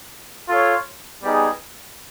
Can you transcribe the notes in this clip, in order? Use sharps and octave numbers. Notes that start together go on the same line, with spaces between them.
F4 A4 C#5
G3 B3 D#4 G#4